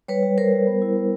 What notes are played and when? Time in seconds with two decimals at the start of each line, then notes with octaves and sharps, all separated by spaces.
0.08 G3 B4 C#5
0.23 G3
0.38 G3 A#4 C5
0.52 G3
0.67 B3
0.82 E4
0.96 B3